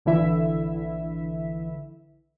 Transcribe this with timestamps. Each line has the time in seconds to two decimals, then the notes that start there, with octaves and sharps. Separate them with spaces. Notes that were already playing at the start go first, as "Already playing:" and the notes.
0.05 A#1 D3 E3 E4 E5